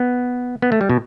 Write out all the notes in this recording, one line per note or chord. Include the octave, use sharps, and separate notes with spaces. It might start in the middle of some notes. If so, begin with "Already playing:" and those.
Already playing: B3
B3
A3
G3
B2